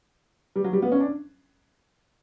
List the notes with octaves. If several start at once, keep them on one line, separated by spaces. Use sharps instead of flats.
G3
F#3
G3
B3
C#4
D4